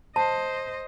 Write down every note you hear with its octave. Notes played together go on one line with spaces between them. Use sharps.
C5 D#5 A5